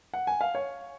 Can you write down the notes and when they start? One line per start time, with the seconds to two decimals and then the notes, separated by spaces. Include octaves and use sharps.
0.14 F#5
0.27 G#5
0.41 F5
0.55 C#5